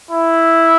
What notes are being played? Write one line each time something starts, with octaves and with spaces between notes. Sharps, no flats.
E4